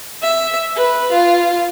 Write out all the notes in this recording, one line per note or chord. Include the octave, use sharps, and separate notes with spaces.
E5
B4
F4